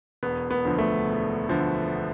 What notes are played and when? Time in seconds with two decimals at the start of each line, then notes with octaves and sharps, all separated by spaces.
0.23 E1 B3
0.51 B3
0.65 D2 D3 F3
0.79 A3
1.07 E1
1.48 D2 D3 F3